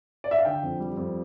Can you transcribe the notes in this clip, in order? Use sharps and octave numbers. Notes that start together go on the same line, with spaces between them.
D5
E5
F5
D3 G5
F2
G3
F2